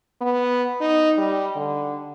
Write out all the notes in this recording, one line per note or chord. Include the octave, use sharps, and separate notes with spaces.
B3
D#4
G3
D3